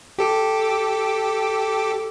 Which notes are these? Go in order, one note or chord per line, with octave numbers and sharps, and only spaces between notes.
G4 A4 D6